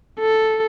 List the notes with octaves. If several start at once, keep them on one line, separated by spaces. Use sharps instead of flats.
A4